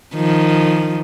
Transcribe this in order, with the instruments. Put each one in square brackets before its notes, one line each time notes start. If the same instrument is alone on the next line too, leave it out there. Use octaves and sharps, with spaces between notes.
[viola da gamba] D#3 F3